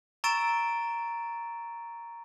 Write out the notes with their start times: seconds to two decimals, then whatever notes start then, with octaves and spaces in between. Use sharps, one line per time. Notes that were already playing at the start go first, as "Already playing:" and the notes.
0.24 A#5 C#6 E6 A6 D7 E7